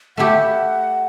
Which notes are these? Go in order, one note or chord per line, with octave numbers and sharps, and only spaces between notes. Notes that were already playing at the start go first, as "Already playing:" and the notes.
A3 E4 G4 F#5